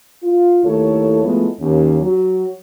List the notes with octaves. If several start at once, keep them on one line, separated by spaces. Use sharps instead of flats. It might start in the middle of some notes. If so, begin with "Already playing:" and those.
F4
D#2 A3 E4 A4 C#5
F3 G#3 A3 B3 E4 F4
D#2 C#4
F#3 F#4